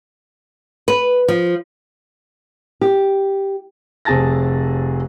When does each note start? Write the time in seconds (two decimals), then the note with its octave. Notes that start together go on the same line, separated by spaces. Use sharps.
0.88 B4
1.28 F3
2.81 G4
4.05 F1 C3 G#4 A5 A6 A#6